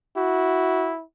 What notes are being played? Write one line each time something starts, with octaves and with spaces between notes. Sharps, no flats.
E4 F#4